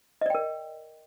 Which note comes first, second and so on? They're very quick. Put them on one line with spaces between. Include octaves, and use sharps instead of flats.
D#5 D5 G5 A#4